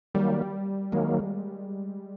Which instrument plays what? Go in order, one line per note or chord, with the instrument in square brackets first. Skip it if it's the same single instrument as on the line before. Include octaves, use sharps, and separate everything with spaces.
[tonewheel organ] D#3 F#3 A#3 [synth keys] G3
[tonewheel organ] D#3 F#3 A#3 [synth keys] G#3